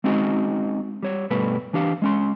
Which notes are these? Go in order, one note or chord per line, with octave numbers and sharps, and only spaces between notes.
G#3 C4 C#4 D#4 F#4 D#5
G3 C#5
G2 B2 G3 A3 B4
E3 D4 G4 F5
G#3 C#4 C6